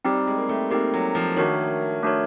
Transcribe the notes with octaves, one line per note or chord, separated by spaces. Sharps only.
G3 C4 D#4 G4
G#3
A#3
A3
A#3 C4 D#4 G4
F#3
F3
D#3 A3 D4 F#4 A#4 C#5
A3 D4 F#4 A#4 C#5